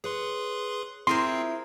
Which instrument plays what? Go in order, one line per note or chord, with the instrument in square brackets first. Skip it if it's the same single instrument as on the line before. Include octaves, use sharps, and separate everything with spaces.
[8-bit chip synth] G#4 B4 C6 [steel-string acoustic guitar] C#5
[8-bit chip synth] C4 C7 [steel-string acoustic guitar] E4 F4 [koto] G#4 A#4 C5 [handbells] C6